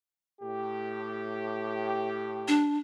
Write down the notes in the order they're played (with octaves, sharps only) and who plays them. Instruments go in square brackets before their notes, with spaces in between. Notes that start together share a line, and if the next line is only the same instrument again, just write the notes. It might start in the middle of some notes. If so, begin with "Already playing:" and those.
[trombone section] A2 G4
[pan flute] D4